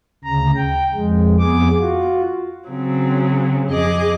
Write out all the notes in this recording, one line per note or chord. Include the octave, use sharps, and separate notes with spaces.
D2 C#3 A#5
G5
F2 G#3
F2 B3 G#4 D6
F4 F#4
C#3 F#3 C4
F2 G#4 D#5 D6